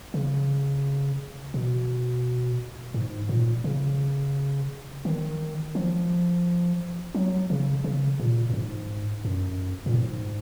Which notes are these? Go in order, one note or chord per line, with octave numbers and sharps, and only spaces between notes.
C#3
B2
G#2
A#2
C#3
D#3
F3
F#3
C#3
C#3
A#2
F#2
G#2
F#2
A#2
G#2